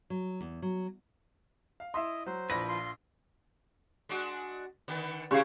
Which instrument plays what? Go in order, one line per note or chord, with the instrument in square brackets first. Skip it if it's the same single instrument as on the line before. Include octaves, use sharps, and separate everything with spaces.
[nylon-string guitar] F#3
E2
F#3
[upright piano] F5
[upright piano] E4 E5 C6 [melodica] D#5
[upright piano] F#3 [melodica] C5
[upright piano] A#1 A#6 [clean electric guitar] F3 E4 B4
[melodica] F4 C6
[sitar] G#3 D4 F#4
D3 D#3 B3
[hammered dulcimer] C#3 C#5 C#6 [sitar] G#3 B3 E4 [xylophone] G4 F5